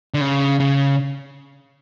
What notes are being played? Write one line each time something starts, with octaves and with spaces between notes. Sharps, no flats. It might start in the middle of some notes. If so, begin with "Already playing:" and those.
D3
C#3
C#3